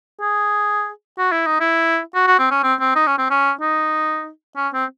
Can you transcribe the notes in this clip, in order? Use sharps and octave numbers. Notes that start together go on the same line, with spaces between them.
G#4
F#4
E4
D#4
E4
F#4
F#4
C4
C#4
C4
C4
D#4
C#4
C4
C#4
D#4
C#4
C4